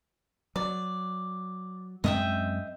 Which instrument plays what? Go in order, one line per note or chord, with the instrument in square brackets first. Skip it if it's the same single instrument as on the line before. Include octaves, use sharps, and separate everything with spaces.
[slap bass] F#3 [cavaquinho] D5
[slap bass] F#2 G#3 C4 [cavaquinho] D#5 E5 G5